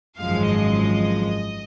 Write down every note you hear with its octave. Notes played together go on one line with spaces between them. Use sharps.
G#1 F#2 F3 G#3 F5
D#5